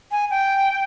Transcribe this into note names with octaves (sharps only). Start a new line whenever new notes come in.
G#5
G5